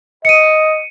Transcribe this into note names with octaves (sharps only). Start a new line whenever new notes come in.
D#5 C#7 D#7